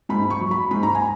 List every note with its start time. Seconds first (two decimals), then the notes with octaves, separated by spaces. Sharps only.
0.09 G#2 B5
0.30 C#6
0.40 F#3
0.51 B5
0.71 G#2 B5
0.83 A#5
0.95 G#5